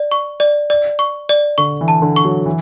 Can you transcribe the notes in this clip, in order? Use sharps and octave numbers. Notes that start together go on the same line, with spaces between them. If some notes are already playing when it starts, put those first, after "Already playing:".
Already playing: D5
C#6
D5
D5
C#6
D5
D3 C#6
E3
A5
D3
C#6
F#3
E3